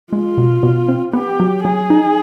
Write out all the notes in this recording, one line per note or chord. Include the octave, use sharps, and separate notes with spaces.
G#3 F4
B2
B2
C4
B3 G4
F#3
F#3 G#4
D#4